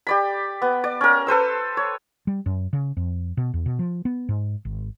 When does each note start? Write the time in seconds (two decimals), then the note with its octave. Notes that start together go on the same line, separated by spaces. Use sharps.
0.07 G4 D5 B5
0.62 B3
0.84 D5
1.01 C#4 A#4
1.27 A4 B4 C5 E6
1.77 C#5
2.27 G3
2.46 F#2
2.73 C#3
2.97 F2
3.37 B2
3.54 E2
3.66 B2
3.79 F3
4.05 B3
4.29 G#2
4.65 G#1